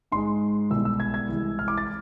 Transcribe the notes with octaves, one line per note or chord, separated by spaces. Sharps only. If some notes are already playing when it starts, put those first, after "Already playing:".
G#2 G#3 C6
C2 B2 G#3 E6
E6
G#6
G#6
C2 C3 E3 G#3
F6
D6
A6